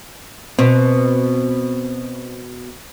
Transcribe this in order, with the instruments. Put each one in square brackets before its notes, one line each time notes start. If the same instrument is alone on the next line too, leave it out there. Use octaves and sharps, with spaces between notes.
[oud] B2 [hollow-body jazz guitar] C4